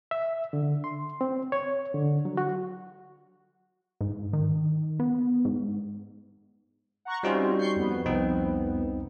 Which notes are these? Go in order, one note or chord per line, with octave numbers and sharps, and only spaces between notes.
E5
D3
C6
C4
C#5
D3
F#3
F#4
G#2
D#3
B3
G#2
F#5 A#5 C#6
G3 C4 C#4 D#4 F4 F#4
C#6 G6 C7
F2 B3
C2 C4 D#4